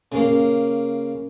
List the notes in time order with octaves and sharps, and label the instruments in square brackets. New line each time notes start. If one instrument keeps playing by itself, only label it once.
[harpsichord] C#3 A#3